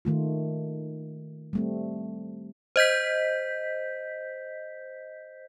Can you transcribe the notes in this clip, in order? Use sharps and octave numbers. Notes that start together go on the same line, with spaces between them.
D#3 A3 F4
G3 A3 C4
C5 D#5 G6 B6